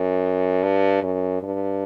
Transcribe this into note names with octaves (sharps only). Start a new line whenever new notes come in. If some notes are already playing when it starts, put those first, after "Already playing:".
Already playing: F#2
G2
F#2
G2